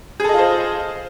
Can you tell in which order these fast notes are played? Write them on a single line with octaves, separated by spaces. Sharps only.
G#4 A4 D#5 F4 C5